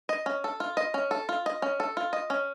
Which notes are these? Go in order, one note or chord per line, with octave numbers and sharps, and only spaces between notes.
D#5
C#4
A4
F4
D#5
C#4
A4
F4
D#5
C#4
A4
F4
D#5
C#4